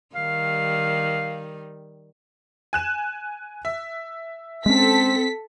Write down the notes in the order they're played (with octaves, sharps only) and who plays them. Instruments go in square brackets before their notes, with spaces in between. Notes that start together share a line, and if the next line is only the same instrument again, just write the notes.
[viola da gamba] D#3 G3 [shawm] F5
[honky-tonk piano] G#5 F#6 E7
E5
[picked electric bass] G#3 C#4 [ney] C4 [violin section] A4 B6